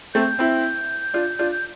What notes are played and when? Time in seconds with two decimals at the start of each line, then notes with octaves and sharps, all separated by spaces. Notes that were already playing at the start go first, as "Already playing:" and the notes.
0.14 A3 C4 G6
0.39 C4 E4
1.14 D4 F4
1.39 D4 F4
1.52 G6